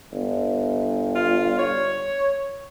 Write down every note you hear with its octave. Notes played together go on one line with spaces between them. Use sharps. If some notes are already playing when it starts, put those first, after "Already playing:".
G1
F4
C#5